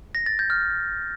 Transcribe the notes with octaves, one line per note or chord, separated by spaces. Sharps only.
A#6
A6
G6
F6